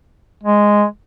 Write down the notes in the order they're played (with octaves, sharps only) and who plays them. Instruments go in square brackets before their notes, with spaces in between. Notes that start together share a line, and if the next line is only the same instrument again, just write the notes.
[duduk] G#3